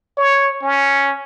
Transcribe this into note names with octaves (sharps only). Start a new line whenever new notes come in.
C#5
C#4